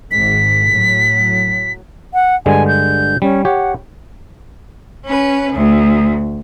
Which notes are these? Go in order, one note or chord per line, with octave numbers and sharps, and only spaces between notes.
G#1 G#2 B6
A2 F#3
F#5
G2 D3 G#3 G#5
G6
G3 C#4
G4 C#5 F#5
C#4 B4
D2